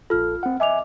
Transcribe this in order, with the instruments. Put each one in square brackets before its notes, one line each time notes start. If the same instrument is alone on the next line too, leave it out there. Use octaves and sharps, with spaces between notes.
[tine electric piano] A#1 A4 [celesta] F4 F6
[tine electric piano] C4 F#5
[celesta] D#5 D6 F7 [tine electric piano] E5 G#5